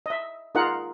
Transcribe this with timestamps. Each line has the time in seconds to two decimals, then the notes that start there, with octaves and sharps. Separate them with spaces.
0.06 D#5 E5
0.55 D#4 F4 G#4 A#4 F#5